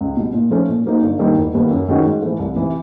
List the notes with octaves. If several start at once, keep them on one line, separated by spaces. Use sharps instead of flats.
C#2
B2 G3
A#2
F3 A3 C#4
A#2
F#3 A#3 D#4
G1
G2 D#3 G3 A#3
E1
D#2 D#3 G3 B3
F#2
D#3 G#3 C#4 F#4
G#2
E3 A3
C2
C3 E3